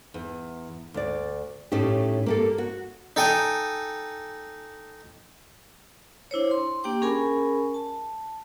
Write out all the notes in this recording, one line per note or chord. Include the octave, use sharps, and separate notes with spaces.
E2
D2 D5
A2 A3 C#4 D#4 G4
A#3 G4 A4
F#4
D#4 A4 G5 G#5
D4 E4 C5 C#5
C6
A#3 D4 G4 G5 D6
C#4 G#4 A#4 G#5 B5
A5